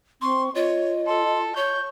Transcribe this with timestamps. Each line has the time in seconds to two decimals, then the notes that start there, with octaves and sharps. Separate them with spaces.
0.22 C4 C6 C#6
0.55 F4 C#5 D#5
1.06 A4 C6
1.56 C#5 C#6 G6